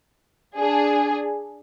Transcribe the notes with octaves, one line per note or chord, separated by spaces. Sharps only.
D4 G#4